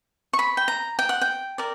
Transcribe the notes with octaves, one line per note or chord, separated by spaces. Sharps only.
C#6
B5
G5
A#5
G5
F#5
G5
A#4 D5